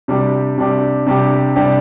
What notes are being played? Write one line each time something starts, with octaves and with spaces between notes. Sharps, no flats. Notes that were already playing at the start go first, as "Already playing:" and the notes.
C3 G3 D4 G4
C3 G3 D4 G4
C3 G3 D4 G4
C3 G3 D4 G4